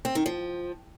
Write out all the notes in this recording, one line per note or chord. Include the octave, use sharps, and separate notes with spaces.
C4
D#3
F3